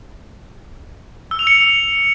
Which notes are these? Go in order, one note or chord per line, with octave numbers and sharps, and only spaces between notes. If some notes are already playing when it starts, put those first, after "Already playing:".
E6
F7
C#7